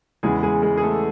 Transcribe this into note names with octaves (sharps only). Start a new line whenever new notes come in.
E2 C#3 E3 G#3 G#4
G#3 G#4
G#3 G#4
G#4
A3 A4